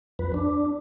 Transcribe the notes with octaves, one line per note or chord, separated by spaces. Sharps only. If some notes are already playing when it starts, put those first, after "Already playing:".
F2 B4
D4